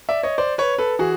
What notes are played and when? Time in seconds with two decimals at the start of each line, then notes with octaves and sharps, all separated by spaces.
0.09 D5 E5
0.23 C#5 D#5
0.38 C5 D5
0.58 B4 C#5
0.78 A4 B4
0.99 E3 F#4 G#4